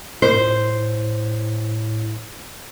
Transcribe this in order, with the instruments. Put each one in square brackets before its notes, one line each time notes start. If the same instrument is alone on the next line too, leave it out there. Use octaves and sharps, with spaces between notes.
[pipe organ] A2 [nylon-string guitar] C5